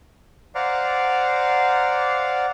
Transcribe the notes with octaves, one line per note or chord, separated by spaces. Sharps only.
C5 D5 F5 F#5 A#5